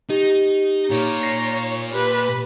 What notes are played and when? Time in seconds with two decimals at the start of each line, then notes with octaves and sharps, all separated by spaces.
0.10 D#4 G4
0.90 A#2 D#4 C#5
1.23 A#6 C7
1.92 G4 B4